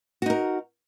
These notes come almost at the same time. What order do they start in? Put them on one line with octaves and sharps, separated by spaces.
F#4 D#4 A#4